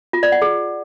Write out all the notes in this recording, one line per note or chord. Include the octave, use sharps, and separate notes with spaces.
F4
D5
F#5
G#4